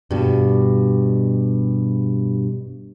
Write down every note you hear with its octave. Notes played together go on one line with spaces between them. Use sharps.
G2 B2